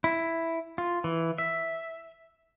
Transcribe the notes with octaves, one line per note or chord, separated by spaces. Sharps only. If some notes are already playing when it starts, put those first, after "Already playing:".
E4
F4
E3
E5